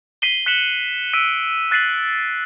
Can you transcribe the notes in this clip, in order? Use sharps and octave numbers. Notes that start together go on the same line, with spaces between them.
B6 C7 D#7 F#7 G7
F#6 B6 C#7 E7 F#7 G7
E6 B6 D7 D#7
F#6 A6 B6 C7 D#7 F#7